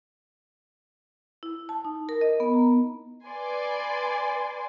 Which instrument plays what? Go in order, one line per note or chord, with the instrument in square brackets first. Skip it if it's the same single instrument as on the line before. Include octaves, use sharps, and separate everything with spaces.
[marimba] E4
A5
D#4
A#4
D#5
B3
A#5
[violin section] B4 D5 G#5 C6